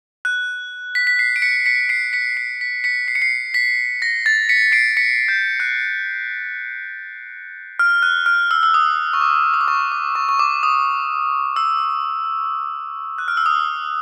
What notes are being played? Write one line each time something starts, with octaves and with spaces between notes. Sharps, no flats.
F#6
B6
B6
C7
D7
B6 C#7
B6 C#7
C7 D7
B6 C#7
C7
B6
B6 C#7
C7
C#7
C7
B6
A#6
A6
B6 C#7
C7 D7
B6 C#7
G6
F#6
F6
F#6
F6
E6
E6
D#6
C#6
D6
D#6
D6
C#6
D6
C#6
C#6
D6
D#6
E6
F#6
F6
E6
D#6